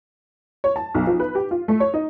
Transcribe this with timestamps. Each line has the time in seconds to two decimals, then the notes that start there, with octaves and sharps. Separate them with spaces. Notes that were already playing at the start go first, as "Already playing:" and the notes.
0.64 C#5
0.76 A5
0.94 B1
1.07 F3
1.20 B4
1.35 G4
1.51 F4
1.68 A3
1.80 C#5
1.94 D#4